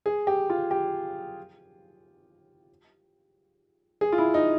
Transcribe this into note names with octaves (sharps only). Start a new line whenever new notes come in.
G#4
G4
F4
G4
G#4
F4
E4
D#4